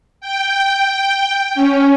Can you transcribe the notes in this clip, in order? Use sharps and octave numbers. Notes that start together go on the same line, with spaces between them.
G5
C#4